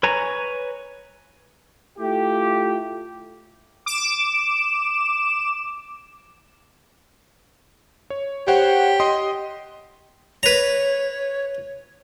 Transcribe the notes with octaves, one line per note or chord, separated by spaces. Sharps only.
B4 C#5 G#5 A#5
A3 E4 F4 G4
D6 E7
C#5
G4 C5 C#5 F#5
D#5 C6 D#6
B4 C#5 A#5